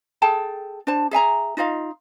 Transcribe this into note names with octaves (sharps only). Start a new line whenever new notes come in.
G#4 A4 G5 A5
D4 C5 A5
G#4 E5 G#5 A#5
D#4 F4 D#5 F5